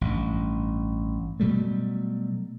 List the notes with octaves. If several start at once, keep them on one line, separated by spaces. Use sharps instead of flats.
A1 G2
B2 F#3 G3 A3